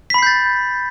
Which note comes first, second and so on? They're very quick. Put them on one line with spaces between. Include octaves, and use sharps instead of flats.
B6 B5 C7 G6 A6